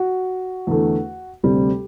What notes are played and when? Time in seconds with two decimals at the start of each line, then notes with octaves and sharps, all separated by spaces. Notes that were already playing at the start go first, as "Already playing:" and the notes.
Already playing: F#4
0.67 E2 D3 A3
1.43 D2 C3 G3 C4 G4